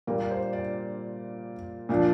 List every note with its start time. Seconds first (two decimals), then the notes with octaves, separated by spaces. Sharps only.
0.07 A#2 G3 A#3 F4 A#4
0.31 C5
0.53 D5
1.89 A#2 F3 D4